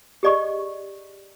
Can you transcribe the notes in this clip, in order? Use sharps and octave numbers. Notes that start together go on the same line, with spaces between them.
G4 G#4 D5 D#5 C#6